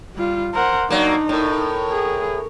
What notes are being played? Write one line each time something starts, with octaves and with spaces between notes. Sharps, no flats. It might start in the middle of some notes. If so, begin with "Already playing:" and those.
G3 F4
A#4 C5 F#5
F#3 A#3 D4 D#4 D5
A2 A#4 C#5
G#4